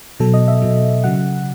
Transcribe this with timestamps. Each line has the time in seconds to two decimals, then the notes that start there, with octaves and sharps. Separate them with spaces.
0.20 B2 F#3 A4
0.34 D#5
0.48 E5
0.62 B2 F#3
1.04 C#3 F#3 F#5